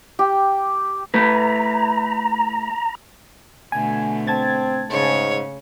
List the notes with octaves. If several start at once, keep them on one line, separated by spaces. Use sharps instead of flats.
G4
A3 E4 B4 A#5
B2 D3 A3 G#5
C4 A5 G#6 A6
G#2 C#3 C#5